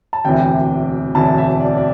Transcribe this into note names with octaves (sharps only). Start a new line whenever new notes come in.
A5
E1 D2 C3 E3 G5
E1 D2 C3 E3 A5
E5
D5
D5